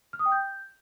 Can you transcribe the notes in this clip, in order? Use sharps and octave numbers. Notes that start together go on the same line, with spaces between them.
F6
D#6
G5
G6